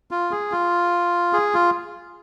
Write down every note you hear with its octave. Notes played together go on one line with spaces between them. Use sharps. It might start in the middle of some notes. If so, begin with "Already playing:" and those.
F4
G#4
F4
G#4
F4